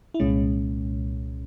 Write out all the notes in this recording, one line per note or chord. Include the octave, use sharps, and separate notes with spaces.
E4
C2 A#2 G#3 C#4